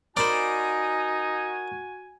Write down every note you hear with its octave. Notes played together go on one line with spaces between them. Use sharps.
D#4 F#4 A#4 C5 D5 G#5 B5